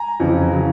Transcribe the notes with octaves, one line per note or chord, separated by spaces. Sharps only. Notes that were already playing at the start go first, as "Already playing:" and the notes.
Already playing: G#5 A#5
F2 C#3 E3
C#3 F#3